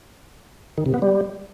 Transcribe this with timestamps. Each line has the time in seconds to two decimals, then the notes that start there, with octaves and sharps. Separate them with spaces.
0.78 D#3
0.86 C3
0.94 B3
1.02 G3